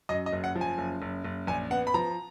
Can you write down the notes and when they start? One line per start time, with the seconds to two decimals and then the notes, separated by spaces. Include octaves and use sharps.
0.09 F#2 D#5
0.26 D#5
0.33 F#1
0.44 F#5
0.55 F3
0.61 G#5
0.78 F#1
1.02 F#1
1.25 F#1
1.47 A#1 G#5
1.71 B3 F#5
1.87 B5
1.94 F3 A#5